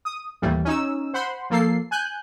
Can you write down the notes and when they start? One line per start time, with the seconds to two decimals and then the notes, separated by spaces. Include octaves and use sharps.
0.05 D#6
0.42 D#2 A2 E3 G3
0.65 C#4 D#4 E6
1.13 C5 F#5 B5 C6
1.50 F3 A#3 A4 C7
1.91 G#5 F#6 G6